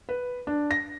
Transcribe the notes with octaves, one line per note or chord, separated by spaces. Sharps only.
B4
D4
A#6